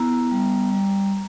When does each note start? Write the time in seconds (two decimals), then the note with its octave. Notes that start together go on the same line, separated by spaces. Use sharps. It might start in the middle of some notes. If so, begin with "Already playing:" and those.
Already playing: B3 E4 A#5
0.31 G3
0.71 G3